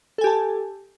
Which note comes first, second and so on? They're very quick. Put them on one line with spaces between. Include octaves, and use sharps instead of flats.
A4 G#5 G4 A5